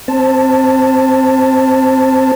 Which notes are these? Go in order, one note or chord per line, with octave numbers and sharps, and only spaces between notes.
C4 C5 A5